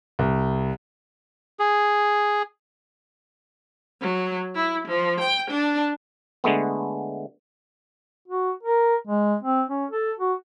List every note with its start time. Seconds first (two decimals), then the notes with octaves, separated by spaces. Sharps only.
0.19 C2
1.59 G#4
4.01 F#3
4.55 E4
4.87 F3
5.20 G5
5.50 D4
6.44 D3 G#3 A3 B3
8.28 F#4
8.63 A#4
9.07 G#3
9.43 C4
9.69 C#4
9.91 A4
10.19 F#4